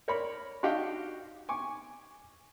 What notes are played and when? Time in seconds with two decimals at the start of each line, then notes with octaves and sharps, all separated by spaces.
0.08 A#4 C#5 D5 B5
0.63 D4 D#4 F#4 G4 D#5 F5
1.49 G#5 C#6 D6